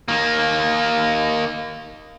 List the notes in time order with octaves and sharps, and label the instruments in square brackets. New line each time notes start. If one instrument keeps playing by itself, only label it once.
[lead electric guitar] D#3 A#3